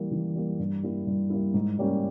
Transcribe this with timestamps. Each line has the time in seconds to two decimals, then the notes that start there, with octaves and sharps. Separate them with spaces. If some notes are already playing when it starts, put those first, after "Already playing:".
Already playing: E3 G3 A#3
0.11 E3
0.35 G3 A#3
0.59 G2
0.83 G3 A#3 E4
1.07 G2
1.30 G3 A#3 E4
1.54 G#2
1.79 G3 A#3 C#4 G4